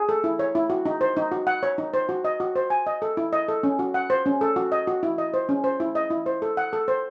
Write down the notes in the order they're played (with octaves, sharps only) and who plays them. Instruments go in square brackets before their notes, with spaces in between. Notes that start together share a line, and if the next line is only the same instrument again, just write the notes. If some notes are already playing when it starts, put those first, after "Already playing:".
Already playing: [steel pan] G#4
A4
E4
C#5
E4
F#4
D#4
C5
D#4
F#4
F#5
C#5
D#4
C5
F#4
D#5
F#4
C5
G#5
D#5
A4
E4
D#5
A4
C#4
F#4
F#5
C5
C#4
A4
F#4
D#5
F#4
E4
D#5
C5
C#4
C5
E4
D#5
E4
C5
A4
F#5
A4
C5